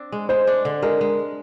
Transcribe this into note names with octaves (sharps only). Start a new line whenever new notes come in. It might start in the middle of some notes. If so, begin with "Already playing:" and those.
Already playing: C4 D4
G#3
G#3 C5
D4
D3
G#3 A#4
G#3